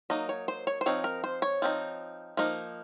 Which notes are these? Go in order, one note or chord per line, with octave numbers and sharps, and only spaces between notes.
F#3 A#3 D#4 D#5
C#5
C5
C#5
C5
F3 C4 D#4 C#5
A#4
C5
C#5
F3 C4 D#4
F3 A#3 D#4